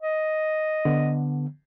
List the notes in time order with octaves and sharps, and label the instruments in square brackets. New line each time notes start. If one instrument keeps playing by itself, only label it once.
[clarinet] D#5
[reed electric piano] D3 B3